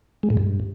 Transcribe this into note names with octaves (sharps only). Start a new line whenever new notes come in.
G#3
A2
G2